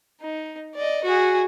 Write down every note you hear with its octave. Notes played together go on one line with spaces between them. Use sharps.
D#4
D5 D#5
F#4 G#4